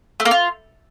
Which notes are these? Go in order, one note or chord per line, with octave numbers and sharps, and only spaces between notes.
A3
A#3
F4